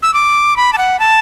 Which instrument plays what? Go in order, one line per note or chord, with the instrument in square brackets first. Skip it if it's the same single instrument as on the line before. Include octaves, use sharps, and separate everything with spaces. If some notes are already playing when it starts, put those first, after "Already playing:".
[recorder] E6
D6
B5
A5
F#5
A5